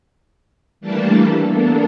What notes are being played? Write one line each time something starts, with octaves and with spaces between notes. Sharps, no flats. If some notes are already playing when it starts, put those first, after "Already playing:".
E3 G3 A3 A#3 D4 A4
A#3 B3 D4 A4 A#4